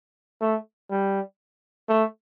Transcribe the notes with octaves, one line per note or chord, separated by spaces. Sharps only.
A3
G3
A3